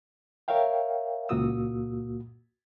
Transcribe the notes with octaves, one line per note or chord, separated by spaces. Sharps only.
A#4 C#5 E5 F5 G5
C#2 A#2 A#3 F#4 D#6 E6